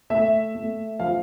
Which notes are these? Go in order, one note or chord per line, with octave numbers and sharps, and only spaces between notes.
A3 E5
A3
F3 F5